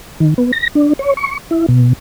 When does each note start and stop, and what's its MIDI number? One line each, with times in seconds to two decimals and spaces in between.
0.20 0.34 51
0.38 0.52 59
0.53 0.68 94
0.75 0.93 62
0.99 1.14 73
1.17 1.38 85
1.51 1.66 64
1.69 1.93 47